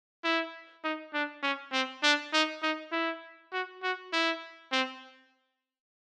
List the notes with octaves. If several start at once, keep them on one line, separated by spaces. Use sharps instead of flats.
E4
D#4
D4
C#4
C4
D4
D#4
D#4
E4
F#4
F#4
E4
C4